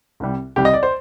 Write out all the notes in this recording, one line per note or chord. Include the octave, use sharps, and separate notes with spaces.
C2 C3 G3
C2 C3 G3 G4
D#5
D5
C5